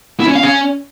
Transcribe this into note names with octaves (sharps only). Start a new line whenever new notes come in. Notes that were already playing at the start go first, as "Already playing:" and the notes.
E4
C#4
F5
C#4